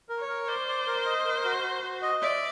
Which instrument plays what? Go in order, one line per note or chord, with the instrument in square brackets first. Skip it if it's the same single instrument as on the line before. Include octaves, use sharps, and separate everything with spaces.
[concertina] A#4
[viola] C#5
[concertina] A#4
[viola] C5 [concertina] D5
[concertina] D5
A#4
D#5
A#4
F#4
F#4
F#4
D#5
[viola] D5 [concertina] E5